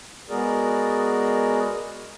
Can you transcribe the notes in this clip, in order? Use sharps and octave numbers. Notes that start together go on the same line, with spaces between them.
G#3 B3 F#4 G#4 A#4 D5